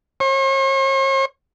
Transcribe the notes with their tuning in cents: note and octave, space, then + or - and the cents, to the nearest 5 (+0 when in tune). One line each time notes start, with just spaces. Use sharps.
C#5 -45